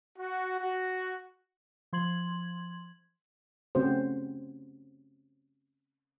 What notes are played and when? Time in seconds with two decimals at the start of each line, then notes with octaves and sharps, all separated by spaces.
0.18 F#4
0.59 F#4
1.93 F3 C6 G#6 F#7
3.75 C#3 A3 C4 C#4 F#4 C5